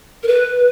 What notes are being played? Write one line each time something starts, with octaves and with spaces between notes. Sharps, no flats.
A#4
B4